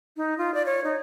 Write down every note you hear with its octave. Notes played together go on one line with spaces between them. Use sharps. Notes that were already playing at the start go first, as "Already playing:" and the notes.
D#4
F4
D5
C#5
D#4